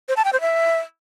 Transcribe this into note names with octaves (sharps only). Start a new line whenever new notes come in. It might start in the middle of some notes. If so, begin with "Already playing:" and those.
C5
A5
G5
C5
E5